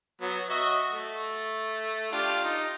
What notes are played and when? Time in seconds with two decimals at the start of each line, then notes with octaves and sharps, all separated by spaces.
0.21 F#3 B3
0.50 F#4 D#5 E5
0.92 A3
2.12 D4 F4 G4
2.44 D#4